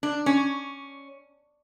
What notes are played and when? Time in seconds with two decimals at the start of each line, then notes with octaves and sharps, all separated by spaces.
0.03 D4
0.26 C#4